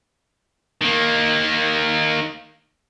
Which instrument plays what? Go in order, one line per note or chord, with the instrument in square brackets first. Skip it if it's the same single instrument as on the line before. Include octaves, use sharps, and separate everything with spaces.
[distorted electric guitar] D#3 A#3